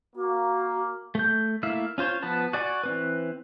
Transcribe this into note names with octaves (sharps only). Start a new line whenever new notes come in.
A#3 F#4
A3 G6
A3 A#3 E4 E5 F5
C#4 F4 C5 C#5
F3 B3 B4 A5
F#4 D5 G#5 B5 C#6
E3 C4 B4